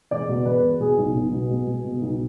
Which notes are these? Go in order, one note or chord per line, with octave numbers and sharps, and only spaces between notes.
E1 D5
B2
E1 B4
E1
B2 G#4
B1
B1
B2
B2
B2
B2
B1